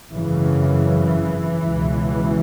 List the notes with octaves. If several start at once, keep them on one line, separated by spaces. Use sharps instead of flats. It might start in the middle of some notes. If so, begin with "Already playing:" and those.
G#1 F#2 C#3 E3
C#2 B2